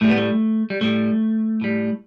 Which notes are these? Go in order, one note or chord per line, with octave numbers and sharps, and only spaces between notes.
A2 G3 A3
B3
A3
G3
A2 G3 A3
A2 G3